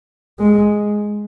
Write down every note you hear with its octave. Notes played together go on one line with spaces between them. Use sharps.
G#3